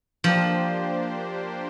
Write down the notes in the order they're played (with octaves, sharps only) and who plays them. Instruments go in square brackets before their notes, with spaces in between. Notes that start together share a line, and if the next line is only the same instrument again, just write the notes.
[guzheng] F3 [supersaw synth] A#3 D4 G4 C5